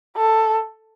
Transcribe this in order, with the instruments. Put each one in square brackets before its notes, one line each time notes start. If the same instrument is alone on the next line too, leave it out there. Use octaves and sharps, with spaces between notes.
[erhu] A4